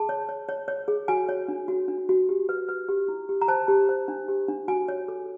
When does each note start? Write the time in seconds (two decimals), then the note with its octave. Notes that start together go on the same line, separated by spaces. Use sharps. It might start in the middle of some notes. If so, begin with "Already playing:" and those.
Already playing: G#4 A5
0.09 C#5
0.29 C#5
0.49 C#5
0.68 C#5
0.88 G#4
1.08 F#4 G#5
1.29 C#5
1.48 D4
1.68 F#4
1.88 D4
2.09 F#4
2.29 G4
2.49 B4
2.69 B4
2.89 G4
3.08 E4
3.29 G4
3.41 A#5
3.48 C5 A5
3.68 G4
3.89 C5
4.08 D4
4.28 G4
4.48 D4
4.68 F#4 G#5
4.88 C#5
5.08 A4